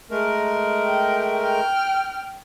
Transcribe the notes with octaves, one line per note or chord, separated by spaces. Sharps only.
G#3 A3 A#4
G5
G5 F6